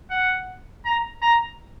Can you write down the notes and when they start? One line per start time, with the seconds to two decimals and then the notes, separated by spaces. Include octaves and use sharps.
0.10 F#5
0.85 A#5
1.22 A#5